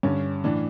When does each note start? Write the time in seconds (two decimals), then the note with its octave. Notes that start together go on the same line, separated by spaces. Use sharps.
0.03 G2 D3 C#4
0.44 A2 E3 D4